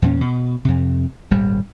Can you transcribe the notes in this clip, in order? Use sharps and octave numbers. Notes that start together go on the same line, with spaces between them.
E2 A#2 C#4
B2
F2 C3
D#1 G#1 G3